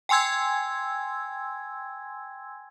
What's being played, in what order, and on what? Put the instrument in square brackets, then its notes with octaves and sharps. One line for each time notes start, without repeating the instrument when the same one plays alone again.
[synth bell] G5 G#5 C6 E6 G#6